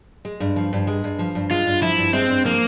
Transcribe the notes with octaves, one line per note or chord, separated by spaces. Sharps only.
G#3
G2
F3
G2
G#3
G2
F3
G2
G#3 F4
G2
F3 E4
G2
G#3 C4
G2
F3 A#3